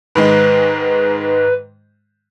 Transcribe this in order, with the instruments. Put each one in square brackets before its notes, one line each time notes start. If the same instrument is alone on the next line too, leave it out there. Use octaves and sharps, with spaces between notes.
[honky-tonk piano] G#2 D#3 G#3 [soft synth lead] B4